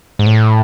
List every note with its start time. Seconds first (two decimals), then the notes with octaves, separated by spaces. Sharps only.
0.19 G#2
0.26 A2